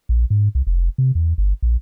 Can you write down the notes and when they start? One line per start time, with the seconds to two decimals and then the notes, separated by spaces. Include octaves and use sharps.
0.09 A#1
0.30 G#2
0.55 C2
0.67 F1
0.98 C3
1.15 E2
1.38 G1
1.62 A#1